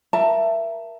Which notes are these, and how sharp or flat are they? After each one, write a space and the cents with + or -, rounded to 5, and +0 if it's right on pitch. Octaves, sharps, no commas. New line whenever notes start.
A#4 +25 E5 +20 A5 +15